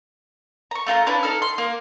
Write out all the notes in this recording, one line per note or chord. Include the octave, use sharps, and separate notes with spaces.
A#5 C#6
A3 F4 G5 A#5
C#4 D4 E4 B4
D#4 A4 F6
C6
A#3